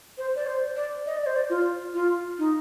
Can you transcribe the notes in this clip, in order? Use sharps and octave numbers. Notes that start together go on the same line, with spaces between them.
C5
D5
C5
D5
D#5
D5
C5
D5
F4
F4
D#4